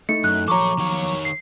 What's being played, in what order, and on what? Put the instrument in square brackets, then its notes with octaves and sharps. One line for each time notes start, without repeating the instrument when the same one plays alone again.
[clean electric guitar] A3 D#4 E4 [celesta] C#7
[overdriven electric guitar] F#2 [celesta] F#6
[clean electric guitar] D#2 F3 F#3 [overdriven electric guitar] A4 C#5 [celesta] A#5 C#6 D6
[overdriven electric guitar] D#3 C#5
[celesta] C7